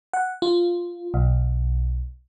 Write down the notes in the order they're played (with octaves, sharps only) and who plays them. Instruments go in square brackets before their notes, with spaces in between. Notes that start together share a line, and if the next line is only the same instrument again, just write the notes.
[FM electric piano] F#5
F4
B1